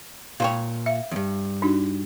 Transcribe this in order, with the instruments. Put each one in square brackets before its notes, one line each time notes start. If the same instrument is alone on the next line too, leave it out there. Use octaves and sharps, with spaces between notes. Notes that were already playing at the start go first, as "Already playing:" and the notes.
[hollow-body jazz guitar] A#2 C5 C#5 [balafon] F5 G5
[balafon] E5 F5
[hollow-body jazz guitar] E2 G2
[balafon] D4 D#4 F#4